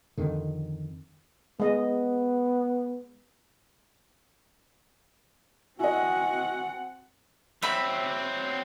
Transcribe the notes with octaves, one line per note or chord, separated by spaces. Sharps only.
F2 D3 D#3
G#3 B3 D#5
C4 E4 F#4 D#5 F#5 G#5
F#3 C4 E5 B5